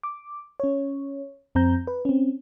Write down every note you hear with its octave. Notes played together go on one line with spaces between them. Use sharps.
D6
C#4 C#5
F2 C4 A#5 G6
B4
C4 C#4